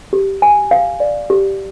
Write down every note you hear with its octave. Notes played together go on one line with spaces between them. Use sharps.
G4
G#5
F5
D5
G4